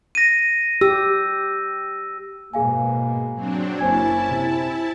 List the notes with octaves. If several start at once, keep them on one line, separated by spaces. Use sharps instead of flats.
A#6 D#7
G4 E6
G#2 B2 A#3 G#4 F5 G#5
F#3 C4 D4
F#1 A#3 C#4 E4 C5 G#5 A5 G#6
C3